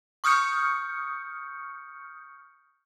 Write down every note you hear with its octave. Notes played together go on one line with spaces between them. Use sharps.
C#6 D#6 F6 G6 C#7